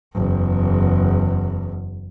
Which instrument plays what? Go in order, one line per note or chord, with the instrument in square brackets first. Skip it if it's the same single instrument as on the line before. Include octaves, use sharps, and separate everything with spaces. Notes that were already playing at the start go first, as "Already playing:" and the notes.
[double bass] F#1 E2